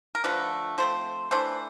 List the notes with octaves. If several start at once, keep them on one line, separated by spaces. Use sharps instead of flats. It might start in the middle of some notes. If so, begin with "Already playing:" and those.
A#4
D3 F3 A3 B4
F3 A3 C4 C5
E3 A3 D4 C5